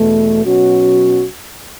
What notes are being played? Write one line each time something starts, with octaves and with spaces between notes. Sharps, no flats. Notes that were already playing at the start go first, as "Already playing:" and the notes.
Already playing: E2 B2 A3
B2 F#3 C#4 F#4